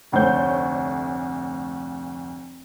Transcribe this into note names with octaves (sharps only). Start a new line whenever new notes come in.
F1 D2 A3 C5 C#5 G6